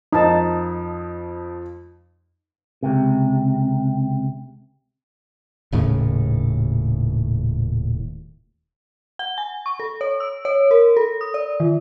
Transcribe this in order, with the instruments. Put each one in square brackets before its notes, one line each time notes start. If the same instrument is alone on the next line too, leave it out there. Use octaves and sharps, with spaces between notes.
[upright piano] F2 F3 [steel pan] D#4 A5
[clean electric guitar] C#2 C3
[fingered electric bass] D#1 D#2 A2 C#3
[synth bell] F#5
G#5
C#6
A4
C#5
E6
C#5
A#4
A4
D#6
D5
D#3